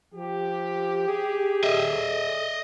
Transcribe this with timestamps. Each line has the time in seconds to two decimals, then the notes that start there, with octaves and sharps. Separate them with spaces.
0.14 F3 G4
1.08 G#4
1.64 A4 D#5 E5